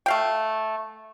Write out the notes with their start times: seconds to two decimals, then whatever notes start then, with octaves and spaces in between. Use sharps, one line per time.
0.06 A3 F5 G5